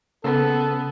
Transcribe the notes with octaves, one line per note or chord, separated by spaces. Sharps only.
C#3 B3 C#4 A4 E6